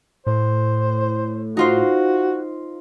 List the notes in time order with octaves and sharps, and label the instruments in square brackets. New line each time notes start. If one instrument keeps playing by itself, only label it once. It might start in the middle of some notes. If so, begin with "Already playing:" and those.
[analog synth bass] A2 [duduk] C5
[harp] D#4 F4 C5 [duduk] F#4